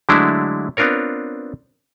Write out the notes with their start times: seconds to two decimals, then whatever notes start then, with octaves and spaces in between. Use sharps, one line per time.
0.09 D3 F#3 G#3 A3 D4 E4
0.77 B3 C4 D4 F4 A#4 C#5